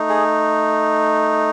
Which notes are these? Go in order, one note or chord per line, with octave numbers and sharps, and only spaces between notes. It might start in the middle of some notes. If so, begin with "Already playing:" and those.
Already playing: A3 D#4
G#4